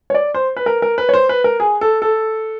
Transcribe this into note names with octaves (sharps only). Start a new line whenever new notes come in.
C#5
D5
C5
B4
A#4
A#4
B4
C#5
C5
B4
A#4
G#4
A4
A4